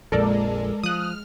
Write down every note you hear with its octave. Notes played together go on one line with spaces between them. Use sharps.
A#1 F2 A#2 G#3 A4 A#4 D5
F3 D#6 F6 F#6